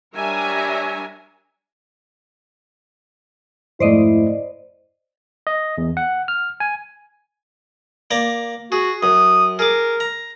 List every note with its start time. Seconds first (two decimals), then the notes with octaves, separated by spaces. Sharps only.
0.15 G3 D4 A#4 C#5 E5 G#5
3.80 F2 G#2 A3 E4 C5 D5 D#5
5.47 D#5
5.78 E2
5.97 F#5
6.28 F6
6.60 G#5
8.11 A#3 D5 A#5
8.72 F#4 G#4
9.03 F#2 D#6
9.59 G#4 A#4 D6
10.00 A#5